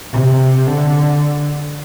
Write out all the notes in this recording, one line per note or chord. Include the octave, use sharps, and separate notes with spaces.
C3
D3